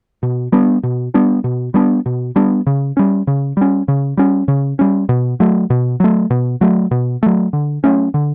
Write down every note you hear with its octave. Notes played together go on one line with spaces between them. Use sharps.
B2
G3 B3 D4
B2
G3 B3 D4
B2
G3 B3 D4
B2
G3 B3 D4
C#3
G3 C#4
C#3
G3 C#4
C#3
G3 C#4
C#3
G3 C#4
B2
F#3 A3
B2
F#3 A3
B2
F#3 A3
B2
F#3 A3
D3
F#3 A3 C#4
D3